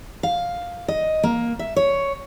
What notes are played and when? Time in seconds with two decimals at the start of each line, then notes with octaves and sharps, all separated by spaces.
0.23 F5
0.88 D#5
1.23 A#3
1.59 E5
1.76 C#5